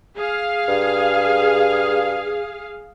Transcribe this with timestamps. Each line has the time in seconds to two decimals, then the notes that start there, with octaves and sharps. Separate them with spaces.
0.16 G#4 F5
0.68 G2